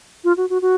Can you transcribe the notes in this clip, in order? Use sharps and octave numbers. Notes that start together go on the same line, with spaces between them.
F4
F#4
F#4
F#4